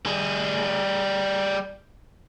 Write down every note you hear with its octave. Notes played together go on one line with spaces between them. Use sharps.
G3 G#4